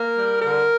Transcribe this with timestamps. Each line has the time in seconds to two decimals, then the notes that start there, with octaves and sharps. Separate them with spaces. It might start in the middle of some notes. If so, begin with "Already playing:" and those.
Already playing: A#3 A#4
0.16 G3
0.42 D3 A#4